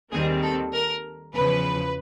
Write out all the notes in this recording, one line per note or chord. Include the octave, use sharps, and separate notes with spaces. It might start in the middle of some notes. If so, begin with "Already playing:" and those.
D#2 D#3 G3 C4 G#4
A4
A#4
E2 C#3 F3 B4